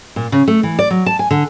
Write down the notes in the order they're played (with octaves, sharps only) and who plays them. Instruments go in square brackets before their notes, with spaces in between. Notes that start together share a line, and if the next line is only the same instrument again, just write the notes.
[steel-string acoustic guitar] A#2
C#3
A3
E3
D5
F#3
A5
G#5
D3